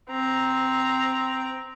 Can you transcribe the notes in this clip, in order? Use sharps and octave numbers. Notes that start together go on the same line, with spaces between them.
C4 A#5